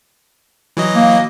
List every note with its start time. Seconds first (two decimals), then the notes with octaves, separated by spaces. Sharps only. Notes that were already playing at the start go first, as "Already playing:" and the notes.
0.77 E3 F#3 D#5
0.95 A#3